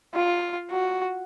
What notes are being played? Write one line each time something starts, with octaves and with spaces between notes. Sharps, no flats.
F4
F#4